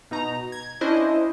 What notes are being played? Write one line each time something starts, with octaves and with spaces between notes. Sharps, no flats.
B2 D#4 A#5
G#6
C#4 D4 E4 C5 D#5